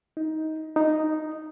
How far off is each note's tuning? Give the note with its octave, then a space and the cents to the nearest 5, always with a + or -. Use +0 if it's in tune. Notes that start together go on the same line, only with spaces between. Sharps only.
D#4 +15
D#4 -5